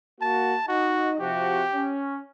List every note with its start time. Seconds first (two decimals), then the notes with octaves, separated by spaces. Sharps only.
0.21 A#3 F#4 A5
0.68 D#4 F#4 D#5
1.20 C3 F3 F#4 G4
1.74 C#4